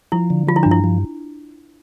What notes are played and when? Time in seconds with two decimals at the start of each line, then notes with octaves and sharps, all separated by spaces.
0.12 F3 E4
0.30 D3
0.47 F3 F4
0.56 E4
0.63 G2 D4
0.71 E4
0.84 F3